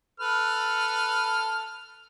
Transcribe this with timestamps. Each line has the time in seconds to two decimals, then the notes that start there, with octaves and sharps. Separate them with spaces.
0.20 A4 B4 F6